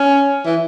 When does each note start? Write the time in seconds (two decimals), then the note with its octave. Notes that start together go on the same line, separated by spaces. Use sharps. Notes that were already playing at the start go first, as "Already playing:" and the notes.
Already playing: C#4
0.45 E3